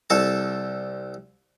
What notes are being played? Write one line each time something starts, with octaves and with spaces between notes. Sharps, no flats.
C2 A4 A5